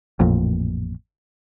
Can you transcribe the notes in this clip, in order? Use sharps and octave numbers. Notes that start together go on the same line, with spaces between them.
A1 F2 A#2